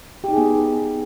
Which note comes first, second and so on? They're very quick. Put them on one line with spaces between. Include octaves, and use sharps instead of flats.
G4 D#4 G#4 B3